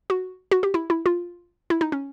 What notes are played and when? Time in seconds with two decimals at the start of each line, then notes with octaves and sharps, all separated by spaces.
0.10 F#4
0.51 F#4
0.63 G4
0.74 E4
0.90 E4
1.06 F4
1.70 E4
1.81 D#4
1.92 C#4